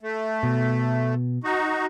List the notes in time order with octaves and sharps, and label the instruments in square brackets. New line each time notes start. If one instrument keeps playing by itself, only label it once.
[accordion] A3
[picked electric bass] B2
[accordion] D#4 F#4